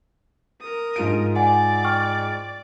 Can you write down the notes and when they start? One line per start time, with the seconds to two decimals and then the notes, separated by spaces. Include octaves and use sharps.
0.61 A#4 D#6
0.96 G#2 F4 D7
1.36 D5 F#5 G#5
1.84 G5 C#6 F6